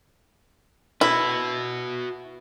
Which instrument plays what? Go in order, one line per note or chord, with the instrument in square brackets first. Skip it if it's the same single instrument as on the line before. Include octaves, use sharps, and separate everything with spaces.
[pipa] E4 [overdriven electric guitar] F#4 B4